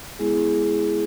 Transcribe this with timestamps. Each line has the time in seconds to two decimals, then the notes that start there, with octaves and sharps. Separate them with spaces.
0.19 G#3 B3 E4 G#4